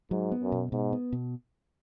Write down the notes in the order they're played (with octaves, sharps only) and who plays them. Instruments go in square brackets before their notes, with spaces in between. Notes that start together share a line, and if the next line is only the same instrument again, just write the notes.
[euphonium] G#2 [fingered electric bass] F#3
[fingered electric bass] B3
[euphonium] F#2
[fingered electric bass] B2
[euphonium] G#2 [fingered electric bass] B2
[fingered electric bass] B3
B2